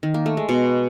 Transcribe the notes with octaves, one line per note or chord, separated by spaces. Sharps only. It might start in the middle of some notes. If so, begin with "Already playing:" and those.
D#3
A#3
A3
G#3
B2